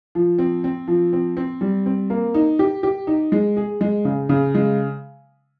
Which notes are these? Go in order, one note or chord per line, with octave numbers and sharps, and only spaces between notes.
F3
C4
C4
F3
C4
C4
G3
C4
A#3
D#4
G4
G4
D#4
G#3
G#4
G#3
C#3
C#3
G#3